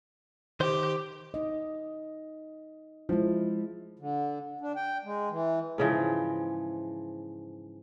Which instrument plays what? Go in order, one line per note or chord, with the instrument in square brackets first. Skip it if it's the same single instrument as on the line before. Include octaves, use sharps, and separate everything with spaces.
[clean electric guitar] D#3 C5 [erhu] G4
[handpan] D#4 D#5
[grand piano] F3 [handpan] G#3 E4
[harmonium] D3
D4
G5
G#3
E3
[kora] G#2 C#3 E3 F3